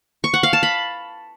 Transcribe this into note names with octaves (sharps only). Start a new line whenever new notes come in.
C#6
F#5
F5
A5
B5